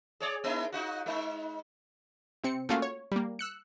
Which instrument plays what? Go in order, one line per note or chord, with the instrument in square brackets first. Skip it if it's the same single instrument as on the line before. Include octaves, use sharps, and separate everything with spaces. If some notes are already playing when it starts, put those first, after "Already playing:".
[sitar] G#4 C#5 D5
A#3 D#4 E4
D#4 F4 F#4
G#3 D#4
[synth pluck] C3 C4 C#7
A3 A#3 C#4 F4 F#4 F5
C#5
G3 A#3
E6 F#6 C#7